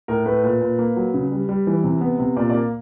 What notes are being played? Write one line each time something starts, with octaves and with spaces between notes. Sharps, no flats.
A2 A#4
A3 B4
A#2
A#2
A#3
F#3
C#3
G3
G3
E3
C3
B3
C3
A#2 D5
D5
A#3